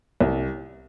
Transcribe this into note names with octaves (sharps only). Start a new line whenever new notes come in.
C2